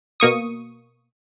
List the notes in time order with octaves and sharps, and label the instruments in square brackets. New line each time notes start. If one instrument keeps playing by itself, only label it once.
[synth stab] B2 A#3 C#6 D#6